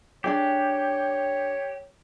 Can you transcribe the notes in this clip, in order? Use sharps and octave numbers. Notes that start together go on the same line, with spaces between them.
D4 D#4 G4 G#4 C#5